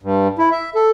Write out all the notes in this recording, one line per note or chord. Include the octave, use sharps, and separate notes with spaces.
G2
E4
E5
A4